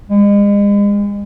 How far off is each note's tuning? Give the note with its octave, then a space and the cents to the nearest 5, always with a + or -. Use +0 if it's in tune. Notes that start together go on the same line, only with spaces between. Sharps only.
G#3 -40